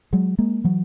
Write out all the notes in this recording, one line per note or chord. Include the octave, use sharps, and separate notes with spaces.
F#3 G#3
G#3 A#3
E3 F#3